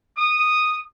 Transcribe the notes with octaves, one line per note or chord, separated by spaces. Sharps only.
D#6